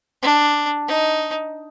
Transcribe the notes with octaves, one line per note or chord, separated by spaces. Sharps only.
D4
D#4